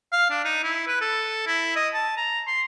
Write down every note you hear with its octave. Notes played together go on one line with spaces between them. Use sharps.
F5
D4
D#4
E4
B4
A4
E4
D#5
A5
A#5
C6